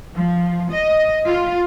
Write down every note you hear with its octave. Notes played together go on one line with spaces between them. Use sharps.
F3
D#5
F4